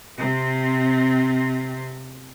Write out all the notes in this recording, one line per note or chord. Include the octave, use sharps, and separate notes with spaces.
C3 C4